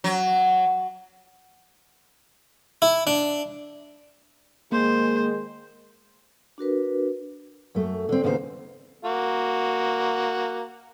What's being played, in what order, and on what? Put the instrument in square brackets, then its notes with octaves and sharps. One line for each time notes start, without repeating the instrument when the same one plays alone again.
[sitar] F#3
[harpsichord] E4
D4
[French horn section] D#3 G#3 [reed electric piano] A#3 [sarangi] C5
[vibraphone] D4 F#4 A#4 B4
[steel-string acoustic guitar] F#2 A3
D3 C4
D#2 C#3 B3 D#4 F#4 C5
[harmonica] A#3 F#4